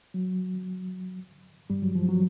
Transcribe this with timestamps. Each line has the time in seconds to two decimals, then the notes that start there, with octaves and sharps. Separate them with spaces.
0.14 F#3
1.70 G2 G3
1.82 F#3
1.95 F3
2.09 F#3